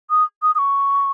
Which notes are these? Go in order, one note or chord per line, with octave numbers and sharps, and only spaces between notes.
D#6
D#6
D#6
C#6